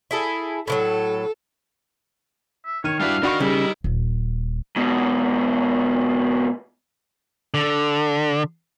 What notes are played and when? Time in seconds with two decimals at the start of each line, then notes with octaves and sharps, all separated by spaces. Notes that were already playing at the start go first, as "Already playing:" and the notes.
0.11 E4 G#4 A4
0.68 A2 E3 F#3 A4
2.66 E5
2.84 D#3 C#5 F6 D#7
3.00 G3 D4 E4 F#4 B4 F5
3.23 D4 D#4 F#4 A#4 D#5 B5 C#6
3.40 C#3 G3 E4
3.84 D#1
4.76 G#2 B2
7.54 D3